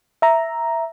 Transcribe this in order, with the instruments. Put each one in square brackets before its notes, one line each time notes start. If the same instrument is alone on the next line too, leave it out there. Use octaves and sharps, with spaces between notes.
[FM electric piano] E5 A#5